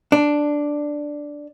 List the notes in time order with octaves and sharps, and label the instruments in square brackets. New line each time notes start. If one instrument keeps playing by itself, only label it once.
[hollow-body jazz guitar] D4